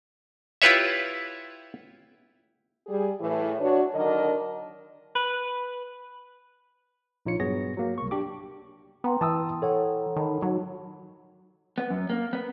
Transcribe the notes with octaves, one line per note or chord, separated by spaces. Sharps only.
E4 F4 G4 B4 C#5 E5
G3 G#4
A2 E3
D4 F#4 C#5
D3 D#3 F#3 D4 A#4 D#5
B4
A#1 D#4 F4 C#5 C#7
G2 F#3 B3 G#4 C#5 A#6
F#3 A#3
C2 C#6
D4 G4 D6
B3 G5 A#5 C6
E3 A5 D#6 E6
A4 C#5 F#5
D#3 A5 B5
F#3 D#4
B3
F#2
A#3
B3